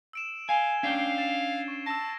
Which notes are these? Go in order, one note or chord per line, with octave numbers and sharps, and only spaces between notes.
E6 D7 E7
F5 G#5 D#7 G7
C#4 D4 F5 G5 G#6 C7
A6 E7
C#6
A5 E6 A#6